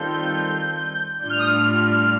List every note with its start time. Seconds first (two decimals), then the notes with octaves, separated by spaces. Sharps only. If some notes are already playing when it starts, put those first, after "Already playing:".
Already playing: D#3 G3 C4 F4 A4 G6
1.21 A2 G3 D4 F4 G6
1.30 F6
1.39 D#6
1.46 F6